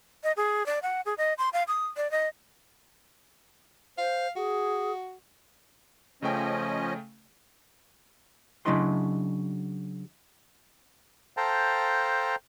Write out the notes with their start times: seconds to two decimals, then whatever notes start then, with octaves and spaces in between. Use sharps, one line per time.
0.23 D#5
0.37 G#4
0.66 D5
0.83 F#5
1.05 G#4
1.18 D#5
1.38 C6
1.53 F5
1.68 D#6
1.97 D5
2.11 D#5
3.98 C5 F5
4.36 F#4 G#4
6.22 C#3 F3 A3 C#4 D#5 G5
8.66 C#3 F#3 D4 E4 D#5 C6
11.37 A4 C5 F5 G5 A5 A#5